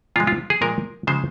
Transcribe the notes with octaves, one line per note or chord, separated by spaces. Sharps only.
A#2 F3 G#3 F4
F4
G#4
A#2 F3 G#3 A#4
C#3 F3 G#3 C5